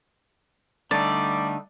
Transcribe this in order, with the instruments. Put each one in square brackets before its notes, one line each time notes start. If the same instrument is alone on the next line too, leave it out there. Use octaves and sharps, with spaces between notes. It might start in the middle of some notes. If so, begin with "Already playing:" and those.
[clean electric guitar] D3 A3 D#4 [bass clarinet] G3 [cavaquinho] D5